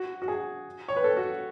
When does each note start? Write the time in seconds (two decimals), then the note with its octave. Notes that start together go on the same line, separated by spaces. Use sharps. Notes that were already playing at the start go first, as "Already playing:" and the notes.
Already playing: F#4
0.22 F#4
0.28 G#4
0.88 C#5
0.97 B4
1.04 A4
1.17 F#4